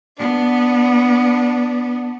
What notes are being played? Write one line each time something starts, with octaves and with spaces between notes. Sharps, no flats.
B3 D4